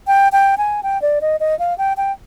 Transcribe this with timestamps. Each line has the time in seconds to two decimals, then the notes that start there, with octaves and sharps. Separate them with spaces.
0.07 G5
0.32 G5
0.58 G#5
0.83 G5
1.02 D5
1.21 D#5
1.40 D#5
1.59 F5
1.78 G5
1.97 G5